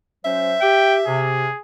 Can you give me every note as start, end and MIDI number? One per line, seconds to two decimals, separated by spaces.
0.25 0.55 54
0.25 0.55 61
0.25 0.55 72
0.25 1.31 76
0.61 1.02 67
0.61 0.96 79
1.06 1.48 48
1.06 1.61 68